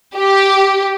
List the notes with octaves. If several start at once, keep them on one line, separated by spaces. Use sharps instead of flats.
G4